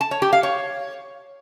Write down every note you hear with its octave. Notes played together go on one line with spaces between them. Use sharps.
A5
C#5
G4
F5
C#5